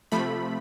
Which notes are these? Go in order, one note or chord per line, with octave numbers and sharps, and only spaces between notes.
C3 F3 A3 B5